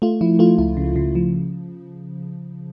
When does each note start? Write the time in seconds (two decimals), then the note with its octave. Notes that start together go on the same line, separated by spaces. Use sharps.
0.02 A3 F4
0.21 F3 E4
0.39 A3 F4
0.58 C#2 E4
0.77 C#3
0.96 C#3
1.15 F3